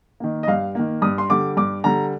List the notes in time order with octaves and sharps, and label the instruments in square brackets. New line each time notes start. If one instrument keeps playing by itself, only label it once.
[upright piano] D#3 A#3
D#5
G2 F5
D#3 A#3
G2 D#6
C6
D3 G3 D6
G2 D6
D3 G3 A#5